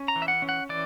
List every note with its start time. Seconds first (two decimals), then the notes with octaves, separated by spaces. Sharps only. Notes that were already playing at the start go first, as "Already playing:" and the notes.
Already playing: C#4
0.08 A#5
0.16 E3
0.22 E5
0.28 F#5
0.42 C#4
0.49 F#5
0.69 E3 D5